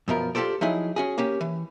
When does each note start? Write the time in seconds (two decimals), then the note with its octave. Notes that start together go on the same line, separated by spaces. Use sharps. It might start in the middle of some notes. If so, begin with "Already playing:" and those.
0.08 F#2 B2 F3 A#4
0.35 F4 G4 A4 C5 D5
0.61 F3 F#3 D#4 E4 G#4
0.96 C#4 F#4 G#4
1.18 A#3 C#4 G4
1.41 E3